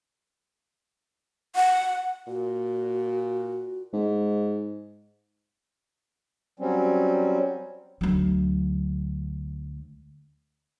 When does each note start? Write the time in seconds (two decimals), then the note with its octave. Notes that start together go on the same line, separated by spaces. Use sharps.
1.56 F#5
2.28 A#2 F#4
3.93 G#2
6.60 F#3 G3 C4 C#4
8.01 D2 F#3